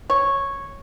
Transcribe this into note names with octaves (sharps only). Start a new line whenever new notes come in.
C#5